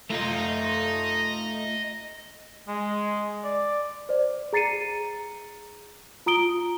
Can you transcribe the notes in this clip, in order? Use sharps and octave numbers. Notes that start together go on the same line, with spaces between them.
A3 F4 D#5 A#5
G#3
D5
C5 D5
G#4 A#5 A6 C7 C#7 D#7
F4 A#5 D#6 D7 G7